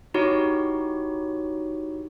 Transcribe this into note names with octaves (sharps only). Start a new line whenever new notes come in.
D#4 E4 F#4 G4 C#5